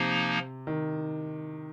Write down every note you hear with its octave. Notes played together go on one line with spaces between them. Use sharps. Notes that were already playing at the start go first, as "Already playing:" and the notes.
Already playing: C3 F3 A#3 D#4
D#3